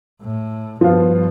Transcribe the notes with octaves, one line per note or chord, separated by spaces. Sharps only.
A2
G2 F3 B3 F4